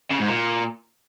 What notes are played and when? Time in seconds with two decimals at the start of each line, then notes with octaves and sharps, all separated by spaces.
0.11 C#3
0.19 G#2
0.28 A#2